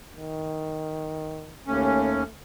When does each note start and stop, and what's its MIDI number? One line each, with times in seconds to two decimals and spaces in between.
0.17 1.59 51
1.67 2.23 39
1.67 2.31 57
1.67 2.23 61